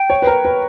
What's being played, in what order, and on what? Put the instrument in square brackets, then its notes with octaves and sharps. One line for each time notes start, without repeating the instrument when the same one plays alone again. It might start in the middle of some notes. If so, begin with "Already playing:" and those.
Already playing: [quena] G5
[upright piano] C#5
B4
A#4
B4